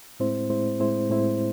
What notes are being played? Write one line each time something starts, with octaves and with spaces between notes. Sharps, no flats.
A2 G#3 C4 E4 C5
A2 G#3 C4 E4 C5
A2 G#3 C4 E4 C5
A2 G#3 C4 E4 C5